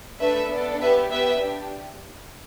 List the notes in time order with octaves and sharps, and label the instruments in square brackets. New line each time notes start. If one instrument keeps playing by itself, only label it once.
[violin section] A3 D4 A4 B4 E5
B3 D4 A4
B3 G4 B4 E5
B3 G4 B4 E5
D4 G4